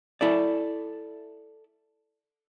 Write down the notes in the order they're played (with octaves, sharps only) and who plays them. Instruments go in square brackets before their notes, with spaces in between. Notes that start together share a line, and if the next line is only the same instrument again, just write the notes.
[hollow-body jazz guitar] E4 A4 D5